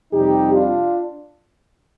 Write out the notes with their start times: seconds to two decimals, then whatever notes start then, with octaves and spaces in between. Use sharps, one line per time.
0.13 F2 C3 G3 D#4 G4
0.54 D4 F4